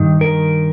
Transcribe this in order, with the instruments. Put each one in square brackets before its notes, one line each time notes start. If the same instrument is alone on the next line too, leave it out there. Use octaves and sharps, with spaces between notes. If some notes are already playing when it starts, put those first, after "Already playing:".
Already playing: [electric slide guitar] G2 D#3
A#4